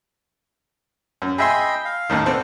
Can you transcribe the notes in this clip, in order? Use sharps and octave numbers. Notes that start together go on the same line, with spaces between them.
F#2
G#4 D#5 E5 G5 B5 C6
F5
D#2 A2 D#3
B3 C4 D4 A4